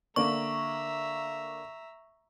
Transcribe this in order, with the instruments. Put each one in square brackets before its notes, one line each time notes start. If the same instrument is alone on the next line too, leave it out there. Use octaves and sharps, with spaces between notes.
[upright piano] D3 A#3 D4 [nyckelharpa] E5 A#5 [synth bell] C#6